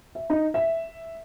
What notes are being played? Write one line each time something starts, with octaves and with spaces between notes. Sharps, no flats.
E5
D#4
E5